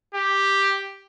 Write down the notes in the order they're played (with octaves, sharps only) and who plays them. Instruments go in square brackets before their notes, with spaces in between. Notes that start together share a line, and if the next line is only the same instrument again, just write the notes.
[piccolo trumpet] G4